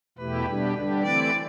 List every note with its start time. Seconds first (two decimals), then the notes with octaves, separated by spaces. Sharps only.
0.18 E2 B2 A3 E4 G4 B4
0.46 B2 G3 D4 G4
0.75 D3 G3 D4 G4
1.02 E3 A3 C4 E4 D5